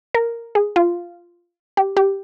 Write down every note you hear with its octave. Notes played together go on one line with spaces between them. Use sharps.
A#4
G#4
F4
G4
G4